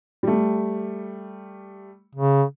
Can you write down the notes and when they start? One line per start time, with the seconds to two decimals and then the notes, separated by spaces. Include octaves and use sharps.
0.23 G3 A3
2.15 C#3